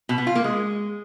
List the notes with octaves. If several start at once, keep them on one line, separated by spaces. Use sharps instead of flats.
B2
B3
F4
A#3
G#3